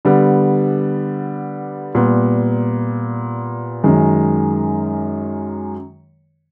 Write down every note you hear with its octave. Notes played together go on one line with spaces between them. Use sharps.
D3 G3 B3
A#2 G3 B3
F#2 D#3 G#3